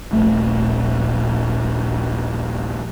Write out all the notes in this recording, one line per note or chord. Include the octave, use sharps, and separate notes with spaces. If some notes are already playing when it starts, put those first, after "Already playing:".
D#1 A#1 A3